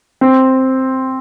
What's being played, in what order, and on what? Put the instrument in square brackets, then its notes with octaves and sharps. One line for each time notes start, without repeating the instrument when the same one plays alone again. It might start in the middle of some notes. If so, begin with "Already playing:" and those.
[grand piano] C4